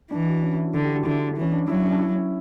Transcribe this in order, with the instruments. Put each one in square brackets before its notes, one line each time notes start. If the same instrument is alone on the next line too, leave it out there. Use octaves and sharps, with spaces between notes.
[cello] E3 [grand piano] D4
[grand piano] F#4
C#4
E4
F#4
[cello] D3 [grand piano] E4
[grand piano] G4
F#4
[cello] D3 [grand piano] E4
[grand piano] E4
D4
[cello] E3 [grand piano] C#4
[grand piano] D4
[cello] F#3 [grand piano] E4
[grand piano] C#4
D4
E4
C#4